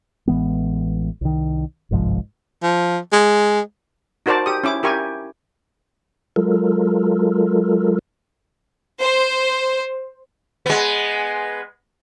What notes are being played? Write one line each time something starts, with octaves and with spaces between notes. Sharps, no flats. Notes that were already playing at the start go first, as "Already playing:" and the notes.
A1 E3 G#3 B3
C2 D#3
G1 C2 G#2 F3
F3
G#3
D#4 F#4 A#4 C5 D5 A5
G4 D#6
C#4 E4 D6
E4 G4 A#4 G#5 C#6
F#3 G#3 F4 A4 A#4
C5
G#3 B3